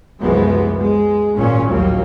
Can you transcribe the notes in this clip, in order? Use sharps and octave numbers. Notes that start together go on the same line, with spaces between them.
C2 F#2 E3 F3 G#3 B3
G#3
G#1 A#2 C#4
A#1 D#2 A#2 F#3 G3 A#3